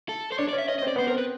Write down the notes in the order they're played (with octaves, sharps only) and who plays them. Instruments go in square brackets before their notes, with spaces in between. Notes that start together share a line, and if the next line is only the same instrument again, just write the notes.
[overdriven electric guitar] A4
C5
[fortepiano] D4 [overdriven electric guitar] C#5
[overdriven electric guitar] D5
[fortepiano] C#4
[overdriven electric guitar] E5
[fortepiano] C#4 [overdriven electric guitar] D#5
[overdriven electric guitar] D#5
[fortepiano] C4
[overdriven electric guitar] D5
[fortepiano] B3 [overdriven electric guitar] C5
[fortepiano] C4 [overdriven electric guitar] A#4
[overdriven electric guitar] B4